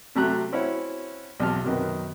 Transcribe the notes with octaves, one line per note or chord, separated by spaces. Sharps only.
C3 F#3 A3 G4 A#5 F#6
C4 C#4 E4 F#4 C#5
B1 E2 C3 G4 A5 F6
F#2 C3 D#3 B3